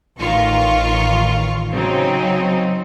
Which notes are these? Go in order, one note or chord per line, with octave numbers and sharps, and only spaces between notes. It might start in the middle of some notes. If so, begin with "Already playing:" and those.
A1 D#3 F4 C#6
C#3 F#3 C4 D#4